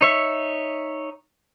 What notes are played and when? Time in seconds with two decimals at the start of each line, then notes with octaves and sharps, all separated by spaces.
0.01 D#4 C#5 E5